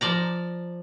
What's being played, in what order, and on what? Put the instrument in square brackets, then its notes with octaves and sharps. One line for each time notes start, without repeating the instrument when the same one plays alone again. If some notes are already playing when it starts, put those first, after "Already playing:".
[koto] F3 D5 A#5